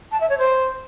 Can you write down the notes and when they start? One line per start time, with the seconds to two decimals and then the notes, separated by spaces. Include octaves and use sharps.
0.12 A5
0.21 E5
0.30 C#5
0.38 C5